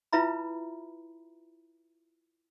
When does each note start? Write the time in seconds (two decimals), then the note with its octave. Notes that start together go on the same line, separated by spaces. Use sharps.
0.13 E4 F4 B4 E5 A#5 B5